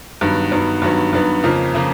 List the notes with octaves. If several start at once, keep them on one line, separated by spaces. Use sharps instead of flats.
G2 D#3 F#3 B3
G2 D#3 F#3 B3
G2 D#3 F#3 B3
G2 D#3 F#3 B3
F2 C#3 F3 A#3
C#3 F3 A#3